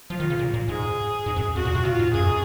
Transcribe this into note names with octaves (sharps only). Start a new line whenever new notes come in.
F3 F4
D#3
C#3
A#2
A#2
G#2 G#4
G#2
F#2
F2 F#4
A#2
C3
A#2 F4
G#2
F#2 G#4